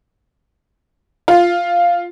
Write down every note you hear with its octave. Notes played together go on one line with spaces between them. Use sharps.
F4